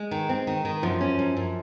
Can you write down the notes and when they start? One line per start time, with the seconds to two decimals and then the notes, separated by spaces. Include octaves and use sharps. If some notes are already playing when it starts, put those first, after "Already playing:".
Already playing: G#3
0.11 D#3
0.29 C4
0.47 D#3
0.65 D#3
0.83 F#2 F3
1.01 C#4
1.19 F#2
1.37 F#2